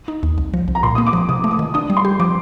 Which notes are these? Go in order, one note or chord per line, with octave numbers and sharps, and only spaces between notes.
D#4
D#2
C2
F3
C2
A#5
A#2 C6
A#3 D#6
D6
F3
C3 D#6
A3
D#6
D#3
D4 D#6
G3
C6
G4
F3 D6